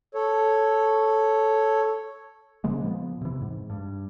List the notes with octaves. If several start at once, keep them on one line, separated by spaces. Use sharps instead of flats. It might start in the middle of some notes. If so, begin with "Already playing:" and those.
A4 C#5
C#3 F3 G#3 A#3
A#2 F3 B3
C3 E3
G#2
G2